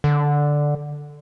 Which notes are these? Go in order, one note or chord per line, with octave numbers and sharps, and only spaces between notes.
D3